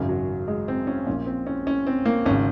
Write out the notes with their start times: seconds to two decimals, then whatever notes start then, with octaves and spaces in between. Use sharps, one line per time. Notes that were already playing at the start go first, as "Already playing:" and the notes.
Already playing: G#1 F#2 C#3
0.09 F#3
0.48 G#3
0.68 C4
0.87 C#4
1.07 A#1 A#2 C#4
1.26 C4
1.47 C#4
1.67 C#4
1.87 C4
2.05 A#3
2.26 G#1 C#4
2.29 C#3